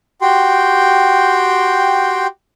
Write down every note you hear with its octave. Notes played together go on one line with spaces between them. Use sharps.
F#4 G4 G5 C6